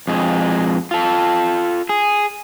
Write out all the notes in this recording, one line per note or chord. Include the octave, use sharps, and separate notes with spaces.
F2 G#3
F4 A4
G#4